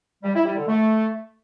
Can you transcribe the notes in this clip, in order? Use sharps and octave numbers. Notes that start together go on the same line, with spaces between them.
G3
E4
G3
D3
A3